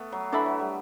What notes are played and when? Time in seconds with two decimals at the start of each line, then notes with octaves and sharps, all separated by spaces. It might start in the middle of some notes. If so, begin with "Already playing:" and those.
Already playing: A3 B3
0.12 F#3
0.32 E3 D4 A4 E5 B5
0.46 F#3
0.59 G3